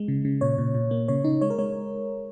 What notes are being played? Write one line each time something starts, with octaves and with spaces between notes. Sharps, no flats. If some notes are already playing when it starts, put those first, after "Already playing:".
Already playing: G#3
C#3
C#3
A#2 C#5
A#2
A#2
A#3
C#3 C#5
C#3 D#4
G#3 C#5
A#4
G#3 C#5